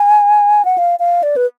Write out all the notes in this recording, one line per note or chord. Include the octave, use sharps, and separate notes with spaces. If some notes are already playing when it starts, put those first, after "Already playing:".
Already playing: G#5
F#5
F5
F5
D5
B4